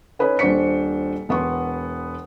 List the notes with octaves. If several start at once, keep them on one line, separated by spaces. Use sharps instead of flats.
C#4 D#4 B4 G#5
D#1 D4 C5 C#6 B6 C#7
E1 B3 C6 C#6